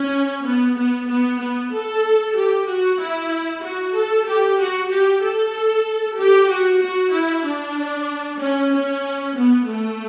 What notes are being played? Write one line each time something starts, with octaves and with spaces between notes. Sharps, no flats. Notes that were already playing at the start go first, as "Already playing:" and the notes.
Already playing: C#4
B3
B3
B3
B3
A4
G4
F#4
E4
F#4
A4
G4
F#4
G4
A4
G4
F#4
F#4
E4
D4
C#4
C#4
B3
A3